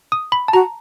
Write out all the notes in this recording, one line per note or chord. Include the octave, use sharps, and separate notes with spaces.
D#6
B5
A5
F#4 A#5